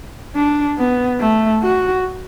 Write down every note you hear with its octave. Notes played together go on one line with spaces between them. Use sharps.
D4
B3
A3
F#4